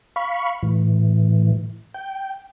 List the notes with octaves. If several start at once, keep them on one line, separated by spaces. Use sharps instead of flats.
F5 B5 C#6
A2 E3
G5